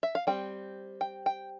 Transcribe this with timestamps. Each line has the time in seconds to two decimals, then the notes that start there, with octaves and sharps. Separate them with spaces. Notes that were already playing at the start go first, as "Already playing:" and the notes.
0.03 E5
0.15 F5
0.27 G3 C4 G5
1.01 G5
1.26 G5